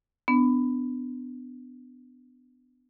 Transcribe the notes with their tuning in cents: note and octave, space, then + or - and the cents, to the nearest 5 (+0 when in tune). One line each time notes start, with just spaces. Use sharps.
B3 +20 D4 +5